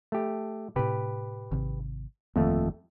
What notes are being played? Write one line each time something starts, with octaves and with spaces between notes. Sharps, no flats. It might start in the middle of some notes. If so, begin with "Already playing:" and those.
A3 G4
A2 C3 G4 B4
G#1 C3
G1 F2 D#3 A3 A#3